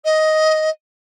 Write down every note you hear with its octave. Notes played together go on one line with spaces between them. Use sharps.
D#5